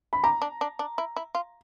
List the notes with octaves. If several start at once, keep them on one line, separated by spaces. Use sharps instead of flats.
B5
G4 A#5
D4
D4
D4
E4
E4
F4